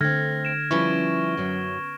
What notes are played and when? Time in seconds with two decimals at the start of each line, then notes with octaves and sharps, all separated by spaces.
0.01 D3 A3 C4 F6 G#6 A#6
0.45 D7 E7
0.71 F3 G3 B3 C#4 E4 C#6 G7
1.37 F#2 F#3